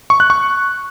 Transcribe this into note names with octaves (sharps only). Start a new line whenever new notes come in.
C#6
F#6
C#6